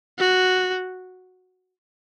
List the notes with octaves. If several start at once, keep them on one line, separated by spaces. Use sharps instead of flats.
F#4